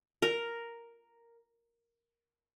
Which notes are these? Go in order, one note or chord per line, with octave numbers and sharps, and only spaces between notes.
A#4